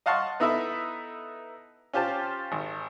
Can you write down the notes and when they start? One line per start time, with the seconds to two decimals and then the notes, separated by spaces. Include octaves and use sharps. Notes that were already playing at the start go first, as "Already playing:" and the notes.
0.06 D#5 F5 F#5 A5 C6 C#6
0.40 B3 D#4 E4 A4 E5 B5
1.93 C#4 F4 G4 C5 A5
2.52 G#1